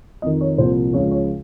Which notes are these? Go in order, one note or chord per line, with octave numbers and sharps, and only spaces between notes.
F2 D#3 D#5
C#5
C2 A#2 F3 C5
C#2 C#3 F3 C#5
C#5